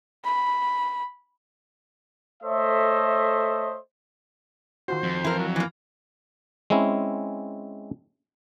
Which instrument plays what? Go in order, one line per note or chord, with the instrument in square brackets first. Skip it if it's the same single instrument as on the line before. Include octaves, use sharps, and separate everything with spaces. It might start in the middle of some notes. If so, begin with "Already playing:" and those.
[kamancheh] B5
[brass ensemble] A3 A4 C5 C#5 D#5 E5
[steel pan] D#3 F4 F#4 [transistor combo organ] C5
[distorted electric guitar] F2
[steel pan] E3 [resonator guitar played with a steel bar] E4 A#4
[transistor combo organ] F#3
[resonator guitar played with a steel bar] E3 A#3
[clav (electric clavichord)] G#3 C4 C#4 E4